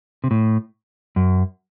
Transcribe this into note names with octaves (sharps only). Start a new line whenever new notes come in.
C3
A2
F#2